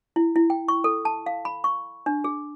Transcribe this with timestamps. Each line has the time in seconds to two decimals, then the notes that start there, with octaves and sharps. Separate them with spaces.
0.16 E4
0.36 E4
0.50 G5
0.68 C#6
0.84 A4
1.05 A5
1.26 F5
1.45 B5
1.64 C#6
2.06 D4
2.24 G#4